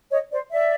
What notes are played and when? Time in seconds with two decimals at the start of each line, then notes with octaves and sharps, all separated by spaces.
0.11 C#5 D#5
0.32 C5 D5
0.51 D5 E5